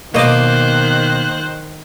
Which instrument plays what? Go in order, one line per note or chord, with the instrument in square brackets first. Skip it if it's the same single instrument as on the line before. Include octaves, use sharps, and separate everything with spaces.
[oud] B2 D#5 [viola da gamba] D#3 [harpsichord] A#3 D6 [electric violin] C5 F#6